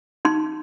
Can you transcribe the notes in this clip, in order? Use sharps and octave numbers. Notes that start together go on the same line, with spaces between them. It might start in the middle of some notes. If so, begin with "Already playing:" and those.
D#4 C6